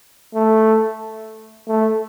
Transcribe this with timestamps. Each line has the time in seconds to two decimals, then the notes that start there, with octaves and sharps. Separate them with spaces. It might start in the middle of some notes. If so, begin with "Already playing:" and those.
0.35 A3
1.68 A3